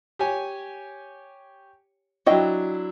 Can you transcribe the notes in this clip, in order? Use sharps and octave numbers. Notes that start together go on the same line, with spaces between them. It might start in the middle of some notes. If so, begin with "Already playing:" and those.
G4 C#5 G#5
F#3 D4 E4 F#4 D#5 G5